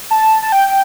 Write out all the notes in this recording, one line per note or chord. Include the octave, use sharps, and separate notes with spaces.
A5
A5
G5